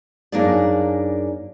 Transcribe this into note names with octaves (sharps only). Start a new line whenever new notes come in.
F#2 A#3 D4 D#4 G#4 D5